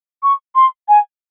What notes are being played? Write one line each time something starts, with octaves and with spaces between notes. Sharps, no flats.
C#6
C6
G#5